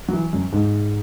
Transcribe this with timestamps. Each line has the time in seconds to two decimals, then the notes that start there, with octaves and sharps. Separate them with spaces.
0.08 F#3
0.13 E3
0.33 F#2
0.52 G#2